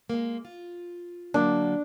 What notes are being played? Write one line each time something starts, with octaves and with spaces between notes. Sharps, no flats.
G#3 A#3
F4
D3 F#3 A#3 D4